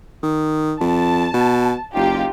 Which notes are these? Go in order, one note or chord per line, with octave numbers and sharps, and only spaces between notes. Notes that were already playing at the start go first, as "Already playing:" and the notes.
D#3
F2 A5
B2
F#1 D#4 F4 G4